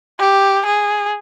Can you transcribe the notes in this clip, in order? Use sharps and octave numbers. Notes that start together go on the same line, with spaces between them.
G4
G#4